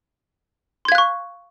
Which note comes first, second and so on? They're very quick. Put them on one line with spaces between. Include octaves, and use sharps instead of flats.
C6 G#6 F5 F#6 C#6